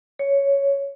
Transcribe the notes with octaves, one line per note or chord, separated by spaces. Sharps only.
C#5